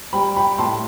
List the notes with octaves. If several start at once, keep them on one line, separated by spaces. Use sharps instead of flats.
G3 G5 B5
G5 B5
A2 A5 C6